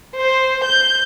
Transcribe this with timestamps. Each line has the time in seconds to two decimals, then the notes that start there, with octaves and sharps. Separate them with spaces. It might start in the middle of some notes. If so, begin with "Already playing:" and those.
0.20 C5
0.69 G6